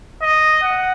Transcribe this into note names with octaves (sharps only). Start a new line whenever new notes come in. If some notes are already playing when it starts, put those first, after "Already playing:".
D#5
F#5